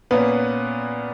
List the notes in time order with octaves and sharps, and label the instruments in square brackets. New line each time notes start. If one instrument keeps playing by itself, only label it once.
[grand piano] A#2 A#3 B3 C#4 B4